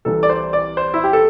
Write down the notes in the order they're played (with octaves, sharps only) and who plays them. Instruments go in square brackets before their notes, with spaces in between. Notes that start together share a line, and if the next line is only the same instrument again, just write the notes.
[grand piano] C2 C3 E3 A4
D5
C5
D5
C5
E4
G4
A4